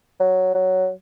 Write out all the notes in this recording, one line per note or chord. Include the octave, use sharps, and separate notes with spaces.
F#3
F#3